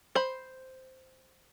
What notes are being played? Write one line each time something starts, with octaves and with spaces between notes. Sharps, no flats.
C5 B5